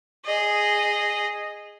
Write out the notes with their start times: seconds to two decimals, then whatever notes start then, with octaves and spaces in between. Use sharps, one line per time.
0.25 G#4 D#5